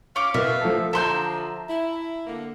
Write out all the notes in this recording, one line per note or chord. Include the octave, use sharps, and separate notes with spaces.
C#4 F5 D6
B2 A#4 B4 E5
F3 A3 A4
D3 F3 E5 A5 A#5 C6 G6
E4
D3 A#3